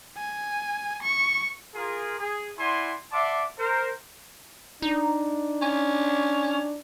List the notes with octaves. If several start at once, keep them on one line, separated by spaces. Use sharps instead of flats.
G#5
C#6
F4 G#4 A#4
G#4
E4 D5 F#5 G#5 C6
D5 E5 F#5 A5 C6 D6
A#4 C5
D4 D#4
C#4